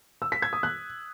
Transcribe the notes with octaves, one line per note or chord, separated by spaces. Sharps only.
E6
B6
G#6
D#6
F#6